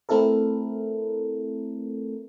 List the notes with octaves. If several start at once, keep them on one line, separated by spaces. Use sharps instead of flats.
A3 C4 E4 A4 A#4